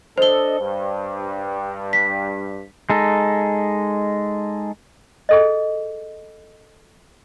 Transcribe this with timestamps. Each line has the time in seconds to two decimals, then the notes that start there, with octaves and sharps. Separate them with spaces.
0.18 D4 A4 C5 D#5 G7
0.60 G2
1.93 B6
2.90 G#3 D#4 A4
5.29 G#4 A4 D#5